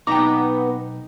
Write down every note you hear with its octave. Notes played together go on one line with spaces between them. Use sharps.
B1 B3 D#4 G5 A#5 D6